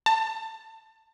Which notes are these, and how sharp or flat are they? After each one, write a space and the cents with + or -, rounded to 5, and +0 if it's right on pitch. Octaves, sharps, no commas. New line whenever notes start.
A5 +20